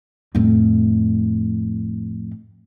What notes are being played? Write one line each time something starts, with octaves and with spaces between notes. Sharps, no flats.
F2 A2